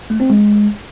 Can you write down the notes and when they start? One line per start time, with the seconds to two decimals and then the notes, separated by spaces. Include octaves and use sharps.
0.10 A3
0.20 C4
0.30 G#3